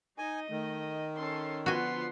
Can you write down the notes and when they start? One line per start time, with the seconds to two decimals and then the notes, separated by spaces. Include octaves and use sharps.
0.18 D#4 D#5 G#5
0.50 D#3 A3
1.16 C#4 A4 C6
1.66 D3 F3 B3 F4 F#4 G#5 C6